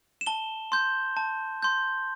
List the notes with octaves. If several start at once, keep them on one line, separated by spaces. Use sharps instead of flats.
E7
A5 G7
C6 G6
A5
C6 G6